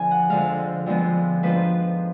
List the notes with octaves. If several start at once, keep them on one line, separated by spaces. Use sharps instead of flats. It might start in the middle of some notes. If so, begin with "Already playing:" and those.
Already playing: D2 D3 F3 B3 D4 G#5
F#5
F2 D3 G#3 F5
F2 D3 F3 G#3 B3
G#2 F3 B3 D4 F4 B4